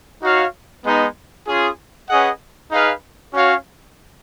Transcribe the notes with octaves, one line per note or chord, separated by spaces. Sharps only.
D#4 F#4 C#5 F5
G#3 B3 D#4
C#4 F4 G#4
C#4 G#4 B4 D#5 F#5
D#4 G#4 B4 F5
C#4 F#4 C#5 F5